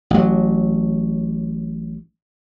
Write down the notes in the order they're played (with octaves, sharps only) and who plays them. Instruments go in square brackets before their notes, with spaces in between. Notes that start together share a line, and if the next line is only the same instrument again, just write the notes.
[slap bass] A1 F#3